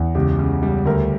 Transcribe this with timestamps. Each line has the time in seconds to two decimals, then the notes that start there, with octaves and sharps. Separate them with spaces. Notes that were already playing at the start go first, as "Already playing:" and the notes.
Already playing: E2
0.15 C#2 G4
0.39 C#3
0.63 G3
0.86 D2 A#4